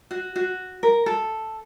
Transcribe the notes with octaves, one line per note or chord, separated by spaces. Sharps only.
F#4
F#4
A#4
A4